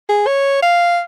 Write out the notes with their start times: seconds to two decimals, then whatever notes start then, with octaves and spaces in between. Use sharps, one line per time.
0.09 G#4
0.27 C#5
0.62 F5